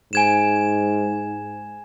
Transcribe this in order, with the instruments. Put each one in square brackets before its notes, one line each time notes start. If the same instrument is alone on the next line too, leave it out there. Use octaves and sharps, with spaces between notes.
[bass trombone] G#2 [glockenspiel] G#5 G#6 E7